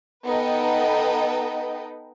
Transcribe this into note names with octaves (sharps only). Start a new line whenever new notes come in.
B3 D#4 A4 B4 D#5 G5